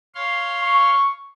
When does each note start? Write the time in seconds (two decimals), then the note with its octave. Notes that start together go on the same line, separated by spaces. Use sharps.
0.15 C#5 F5 C6
0.63 C#6